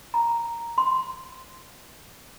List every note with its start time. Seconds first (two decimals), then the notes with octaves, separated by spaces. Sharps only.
0.14 A#5
0.78 C6